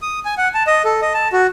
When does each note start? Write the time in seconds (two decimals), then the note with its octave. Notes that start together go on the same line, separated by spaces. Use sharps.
0.02 D#6
0.25 G#5
0.38 F#5
0.54 A5
0.67 D#5
0.85 A4
1.02 D#5
1.14 A5
1.33 F#4